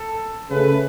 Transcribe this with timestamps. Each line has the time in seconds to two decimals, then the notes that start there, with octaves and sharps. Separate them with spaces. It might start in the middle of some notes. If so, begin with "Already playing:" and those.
Already playing: A4
0.50 C#3 A3 B4